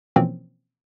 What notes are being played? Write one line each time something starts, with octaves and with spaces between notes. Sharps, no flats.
B2 E3 F3 A#3 C4 C#4